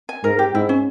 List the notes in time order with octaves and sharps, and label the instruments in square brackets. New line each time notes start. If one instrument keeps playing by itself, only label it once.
[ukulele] G#5
[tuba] G#2 [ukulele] A#4
[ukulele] G4
[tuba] G#2 [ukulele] E4
[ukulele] C#4